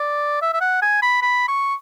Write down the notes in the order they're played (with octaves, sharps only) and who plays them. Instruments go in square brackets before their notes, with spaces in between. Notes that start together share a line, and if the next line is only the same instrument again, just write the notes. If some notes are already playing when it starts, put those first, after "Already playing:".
Already playing: [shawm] D5
E5
E5
F#5
G#5
B5
B5
C#6